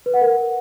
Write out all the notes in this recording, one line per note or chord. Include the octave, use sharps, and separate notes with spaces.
B4
F#5
A#4